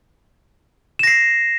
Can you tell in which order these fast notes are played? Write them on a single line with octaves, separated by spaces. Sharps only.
E7 A#6 C7